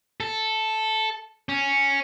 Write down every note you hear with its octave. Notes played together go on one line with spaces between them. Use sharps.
A4
C#4